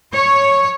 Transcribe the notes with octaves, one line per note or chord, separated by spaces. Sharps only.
C#5